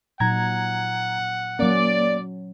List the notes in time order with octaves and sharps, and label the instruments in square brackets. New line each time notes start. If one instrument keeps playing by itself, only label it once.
[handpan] A#2 F#3 D#4 [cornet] F#5 [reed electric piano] A#5 G#6
[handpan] F#3 C#4 [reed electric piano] A#3 [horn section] D5